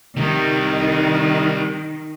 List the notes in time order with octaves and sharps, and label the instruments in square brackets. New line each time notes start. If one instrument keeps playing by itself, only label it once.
[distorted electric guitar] C3 G3 [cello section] D#3